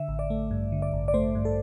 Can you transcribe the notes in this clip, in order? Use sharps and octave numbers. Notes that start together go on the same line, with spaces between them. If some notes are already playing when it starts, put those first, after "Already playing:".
Already playing: D3 E5
A1
D5
A3
G2
D3
D5
A1
D5
A3 C5
G2
A4